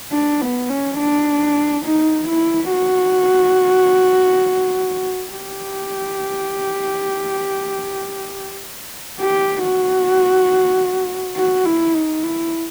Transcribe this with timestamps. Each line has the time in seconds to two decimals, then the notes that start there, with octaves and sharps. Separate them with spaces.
0.12 D4
0.41 B3
0.69 C#4
0.98 D4
1.85 D#4
2.28 E4
2.71 F#4
5.31 G4
9.19 G4
9.63 F#4
11.36 F#4
11.65 E4
11.94 D#4
12.23 E4